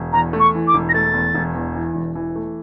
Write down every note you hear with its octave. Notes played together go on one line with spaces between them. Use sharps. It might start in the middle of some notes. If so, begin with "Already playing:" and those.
Already playing: E1
E2 A#5
A3
C#6
E3
D6
E1
A#6
A3 A6
E2
E1
E2
E3
E1
E3
A3